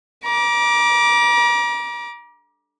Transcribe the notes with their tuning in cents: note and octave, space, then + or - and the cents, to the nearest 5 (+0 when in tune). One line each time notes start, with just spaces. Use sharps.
A#5 +40 D6 +0